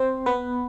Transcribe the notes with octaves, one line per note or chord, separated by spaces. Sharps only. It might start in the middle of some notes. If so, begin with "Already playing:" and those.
Already playing: C4 C5
B3 B4